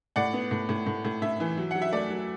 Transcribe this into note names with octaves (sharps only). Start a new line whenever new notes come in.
A2 D5 F#5
B3
A2
A2
A2
A2
A2 E5
E3
F#3
F#3 F#5
E5
A3 D5
F#3